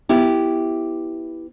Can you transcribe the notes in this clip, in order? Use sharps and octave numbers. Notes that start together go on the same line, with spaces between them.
B3 E4 G4